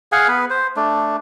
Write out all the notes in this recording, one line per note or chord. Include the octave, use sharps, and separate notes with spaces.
G#4 F5 F#5 G#5
B3 B4
C5
A3 D4